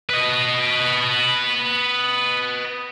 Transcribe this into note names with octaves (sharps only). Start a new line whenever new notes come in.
B4 D#5